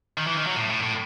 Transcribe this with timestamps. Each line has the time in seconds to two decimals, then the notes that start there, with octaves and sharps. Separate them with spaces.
0.18 D#3
0.27 E3
0.37 D#3
0.47 F#3
0.56 A2
0.70 A2
0.83 A2